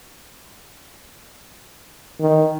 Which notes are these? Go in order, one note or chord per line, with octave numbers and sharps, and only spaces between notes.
D#3